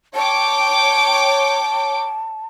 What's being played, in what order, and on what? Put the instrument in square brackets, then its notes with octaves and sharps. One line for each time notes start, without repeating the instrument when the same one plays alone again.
[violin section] C#5 G5 D6 [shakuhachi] A5